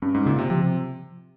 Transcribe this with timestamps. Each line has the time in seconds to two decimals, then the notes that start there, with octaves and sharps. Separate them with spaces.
0.02 G2 C#4
0.15 G#2
0.26 A#2 C#3
0.39 C3
0.50 C3 F3